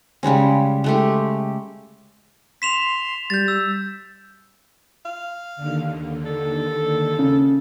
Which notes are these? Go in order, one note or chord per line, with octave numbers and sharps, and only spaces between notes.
C#3 G3 G#3 C#4
G#3 A3 G4
C6 B6 E7 F7
G3 G6 A6
E6
F5
D#2 D3
A4
C#3